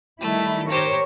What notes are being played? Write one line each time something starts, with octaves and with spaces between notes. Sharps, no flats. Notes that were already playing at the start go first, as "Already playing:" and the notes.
D#3 G3 A3 E4
G4 A#4 C5 C#5